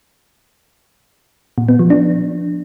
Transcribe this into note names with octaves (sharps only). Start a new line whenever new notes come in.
A#2
B3
F3
D4